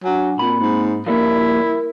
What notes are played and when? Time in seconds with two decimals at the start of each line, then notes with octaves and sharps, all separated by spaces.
0.04 F#3 D4 F#5 G#5
0.39 A#2 A#3 C4 B5
0.60 G#2
1.06 F3 G3 A#3 E4 A#4